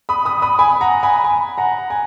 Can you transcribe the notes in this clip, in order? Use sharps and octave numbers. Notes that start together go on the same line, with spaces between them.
B5 D#6
B5 D#6
B5 D#6
G#5 B5
F#5 A#5
G#5 B5
G#5 B5
F#5 A#5
G#5